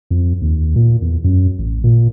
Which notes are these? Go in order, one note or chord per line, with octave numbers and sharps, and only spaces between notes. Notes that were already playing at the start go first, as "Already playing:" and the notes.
F2
D#2
A#2
E2
F#2
A1
A#2